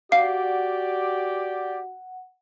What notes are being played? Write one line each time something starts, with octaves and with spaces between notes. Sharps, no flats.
F#4 G4 D5 F5 F#5 C7